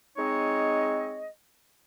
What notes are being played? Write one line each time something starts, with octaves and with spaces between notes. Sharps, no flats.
G#3 C4 D#4 C#5 D#5